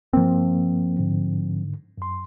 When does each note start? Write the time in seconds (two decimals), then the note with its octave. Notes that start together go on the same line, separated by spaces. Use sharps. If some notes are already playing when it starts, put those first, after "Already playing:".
0.13 G2 F3 A#3 C4
0.99 G#2 D3
1.98 F#2 C6